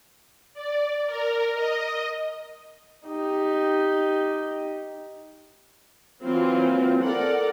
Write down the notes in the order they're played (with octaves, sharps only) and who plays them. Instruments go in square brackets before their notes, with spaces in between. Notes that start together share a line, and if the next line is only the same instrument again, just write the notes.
[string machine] D5
A#4
D#5
[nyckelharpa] D#4 G4
[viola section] E3 F#3 A#3 C4 F4
A4 A#4 D5 F#5